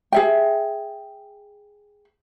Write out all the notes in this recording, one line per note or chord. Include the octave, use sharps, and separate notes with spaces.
G#4 E5 G5